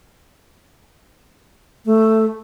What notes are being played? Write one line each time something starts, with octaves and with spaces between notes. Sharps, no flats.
A3